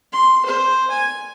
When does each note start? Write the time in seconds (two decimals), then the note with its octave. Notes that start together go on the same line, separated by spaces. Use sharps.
0.13 C6
0.46 C5
0.91 G#5